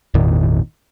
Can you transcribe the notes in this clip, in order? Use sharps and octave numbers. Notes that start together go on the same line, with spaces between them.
G#1 E2 A#2 D#3